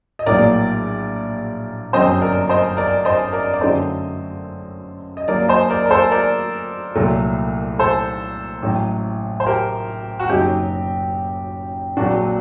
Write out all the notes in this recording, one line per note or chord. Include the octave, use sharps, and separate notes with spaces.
D#5
A#1 A2 F#3 A#3 A#4 D5
G1 F#2 F#3 C4 C5 D#5
A#4 D5
C5 D#5
A#4 D5
C5 D#5
A#4 D5
D5
F#2 D3 F#3 A3 C4 C5 D#5
D#5
G2 F#3 A#3 A#4 D5
C5 D#5
A#4 D5
A#4
A4 C5
A#4 D5
C2 A#2 F#3 A3
A4 C5
A1 A2 F#3
C5
G4 A#4
F#4
F#1 F#2 F#3 C4 D#4 G4
A#1 A#2 F#3 C4 D4 F#4